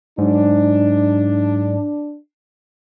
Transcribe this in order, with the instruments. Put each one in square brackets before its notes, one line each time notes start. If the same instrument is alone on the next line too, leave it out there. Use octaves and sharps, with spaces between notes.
[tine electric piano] G#2 F#3 [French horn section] D4